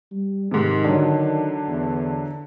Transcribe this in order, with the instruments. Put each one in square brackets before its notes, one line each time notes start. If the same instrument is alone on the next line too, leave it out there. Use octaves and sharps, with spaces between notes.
[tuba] G3
[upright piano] G#2 C3 [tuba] D#3
[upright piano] D3 F#3
[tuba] E2